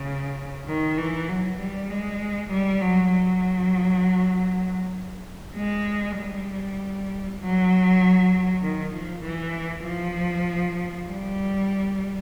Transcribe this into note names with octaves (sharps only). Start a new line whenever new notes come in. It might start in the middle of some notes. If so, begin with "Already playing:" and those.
Already playing: C#3
D#3
E3
F#3
G3
G#3
G3
F#3
F#3
G#3
G3
F#3
D#3
F3
E3
F3
G3